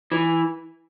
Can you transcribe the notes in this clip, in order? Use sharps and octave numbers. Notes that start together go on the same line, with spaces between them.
E3